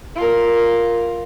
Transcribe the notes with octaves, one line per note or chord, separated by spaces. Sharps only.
F4 A#4